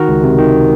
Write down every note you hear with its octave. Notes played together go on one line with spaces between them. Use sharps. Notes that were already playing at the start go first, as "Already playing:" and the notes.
Already playing: D#3 F#4 A#4
C#2
C3
D#3